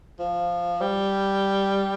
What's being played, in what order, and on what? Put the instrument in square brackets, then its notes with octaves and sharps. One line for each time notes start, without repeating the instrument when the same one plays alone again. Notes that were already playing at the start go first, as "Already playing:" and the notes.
[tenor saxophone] F3
G3